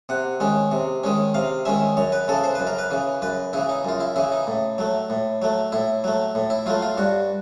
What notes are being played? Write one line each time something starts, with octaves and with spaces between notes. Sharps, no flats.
C3 F#5
D#3 G#3 C#4
C3
D#3 G#3 C#4
C3 F5
D#3 G#3 C#4 E5
F#2 C#5
B4
C#3 E3 A4
C5
F#2 B4
A#4
B4
C#3 E3
F#2 B4
C#3 E3 E4
D#4
F#2 F4
E4
C#3 E3 E4
D#4
A2
F#3 A3
A2
F#3 A3
A2 E4
F#3 A3
A2
E4
F#3 A3 F4
F4
G2 F#4